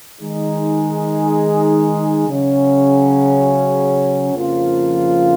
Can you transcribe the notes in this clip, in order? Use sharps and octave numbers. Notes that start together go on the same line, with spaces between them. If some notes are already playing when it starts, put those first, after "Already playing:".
D#3 G#3 D#4 G#4
C#3 F#3 C#4
F2 C#3 F3 A#3 F4